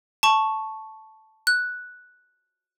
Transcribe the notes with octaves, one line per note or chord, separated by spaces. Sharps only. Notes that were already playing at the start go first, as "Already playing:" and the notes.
A5 C#6
F#6